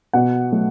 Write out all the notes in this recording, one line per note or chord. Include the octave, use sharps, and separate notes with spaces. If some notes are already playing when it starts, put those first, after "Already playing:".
B2 F#5
F#3 A3